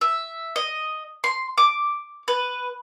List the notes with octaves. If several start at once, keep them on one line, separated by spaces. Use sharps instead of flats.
E5
D#5
C6
D6
B4